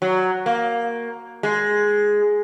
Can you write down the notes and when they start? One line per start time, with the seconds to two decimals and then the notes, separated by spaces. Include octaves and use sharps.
0.02 F#3
0.46 A#3
1.43 G#3